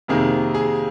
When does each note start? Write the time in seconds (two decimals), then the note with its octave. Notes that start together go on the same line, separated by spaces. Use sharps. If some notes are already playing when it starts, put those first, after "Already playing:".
0.08 F2 C3 D#3 A#3 G#4
0.54 G#4